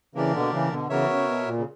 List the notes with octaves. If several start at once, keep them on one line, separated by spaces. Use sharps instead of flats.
C#3 E3 A#3 D4 G4 A#4 D5
B2 D3
C#3 E3
B2 D3
C#3 E3 B3 F#4 A#4 C#5 E5
C#3
B2
A#2
C#3